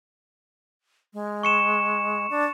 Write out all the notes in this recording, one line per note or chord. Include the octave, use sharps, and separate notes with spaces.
G#3
C#6 C#7 E7
D4